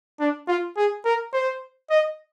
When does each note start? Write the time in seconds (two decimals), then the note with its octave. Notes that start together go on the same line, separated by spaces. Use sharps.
0.20 D4
0.48 F4
0.77 G#4
1.05 A#4
1.33 C5
1.90 D#5